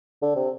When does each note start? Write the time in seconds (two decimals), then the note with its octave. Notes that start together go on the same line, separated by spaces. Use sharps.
0.22 D3
0.36 C3